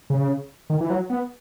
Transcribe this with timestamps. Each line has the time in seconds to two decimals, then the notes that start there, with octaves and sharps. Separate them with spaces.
0.10 C#3
0.70 D#3
0.81 E3
0.90 F#3
1.10 B3